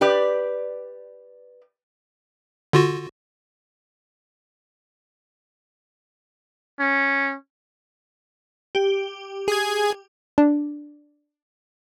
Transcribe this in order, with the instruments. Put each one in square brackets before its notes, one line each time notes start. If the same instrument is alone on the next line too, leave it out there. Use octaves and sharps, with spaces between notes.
[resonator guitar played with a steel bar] G4 B4 D5
[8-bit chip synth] D3 F4 F#4
[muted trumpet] C#4
[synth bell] G4
[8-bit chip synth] G#4 G#6
[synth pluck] D4